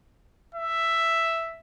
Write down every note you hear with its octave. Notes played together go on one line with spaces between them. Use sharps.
E5